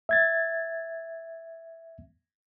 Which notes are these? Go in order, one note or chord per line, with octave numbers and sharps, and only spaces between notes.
E5 G#6 A6